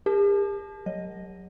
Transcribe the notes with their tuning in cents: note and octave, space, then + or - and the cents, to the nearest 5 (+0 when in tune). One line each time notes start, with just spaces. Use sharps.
G4 +45 A#4 +0 A5 -25
F#3 +0 D#5 +0